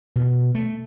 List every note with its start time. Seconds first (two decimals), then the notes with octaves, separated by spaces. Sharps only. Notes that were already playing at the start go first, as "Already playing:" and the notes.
0.16 B2
0.55 A3